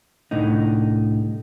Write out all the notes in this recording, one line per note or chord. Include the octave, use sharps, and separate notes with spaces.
C2 A2 D3 D#4